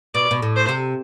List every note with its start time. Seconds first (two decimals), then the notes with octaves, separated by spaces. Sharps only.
0.14 B2 D5
0.31 B2
0.42 A2
0.56 C5
0.69 C3